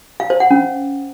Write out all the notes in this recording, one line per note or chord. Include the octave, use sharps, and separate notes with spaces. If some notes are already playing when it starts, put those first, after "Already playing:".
F5
C5
F#5
C#4